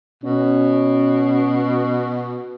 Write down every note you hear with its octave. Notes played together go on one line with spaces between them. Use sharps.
B2 C#4